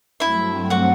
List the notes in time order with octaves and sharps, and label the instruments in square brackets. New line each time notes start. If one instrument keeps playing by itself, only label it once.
[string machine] G2 F#3 A3 C4 [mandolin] E4 E5
[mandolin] F#4 F#5